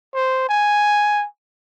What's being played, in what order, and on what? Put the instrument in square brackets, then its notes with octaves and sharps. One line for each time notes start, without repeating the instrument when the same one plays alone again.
[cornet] C5
G#5